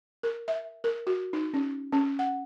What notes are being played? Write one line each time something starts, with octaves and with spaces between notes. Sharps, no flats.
A#4
E5
A#4
F#4
D#4
C#4
C#4
F#5